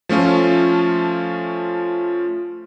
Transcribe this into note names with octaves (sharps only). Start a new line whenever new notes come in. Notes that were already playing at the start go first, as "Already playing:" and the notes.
F3 A3 C#4 F4